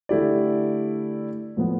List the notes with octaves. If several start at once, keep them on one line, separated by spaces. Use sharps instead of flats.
D3 A3 E4 G4 D5
A2 F3 B3